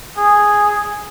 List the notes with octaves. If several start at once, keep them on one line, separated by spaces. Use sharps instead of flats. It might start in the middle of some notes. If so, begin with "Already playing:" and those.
G#4